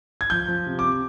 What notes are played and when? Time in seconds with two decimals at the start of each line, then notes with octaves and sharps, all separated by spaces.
0.21 G#6
0.30 F3 G6
0.48 F3
0.66 C3
0.79 D6
0.85 C3